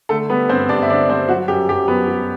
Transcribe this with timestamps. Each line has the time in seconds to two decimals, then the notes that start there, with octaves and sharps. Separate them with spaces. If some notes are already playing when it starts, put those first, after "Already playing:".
0.09 D3 A3 A4
0.29 G3 B3 B4
0.49 G2 C4 C5
0.69 G2 D4 D5
0.82 E5
0.89 D3 D4 D5
1.09 G3 C4 C5
1.29 F#3 F#4
1.48 F#2 G4
1.69 F#2 G4
1.88 F#3 B3 B4
2.08 F#3